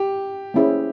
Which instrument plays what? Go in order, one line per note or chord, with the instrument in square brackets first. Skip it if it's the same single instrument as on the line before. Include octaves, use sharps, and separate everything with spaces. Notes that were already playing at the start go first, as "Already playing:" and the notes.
Already playing: [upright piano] G4
[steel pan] A#3 C#4 E4 G#4 C5